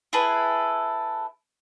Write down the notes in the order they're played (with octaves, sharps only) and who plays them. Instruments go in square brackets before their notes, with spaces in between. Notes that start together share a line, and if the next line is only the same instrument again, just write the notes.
[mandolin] E4 G#4 A4 B4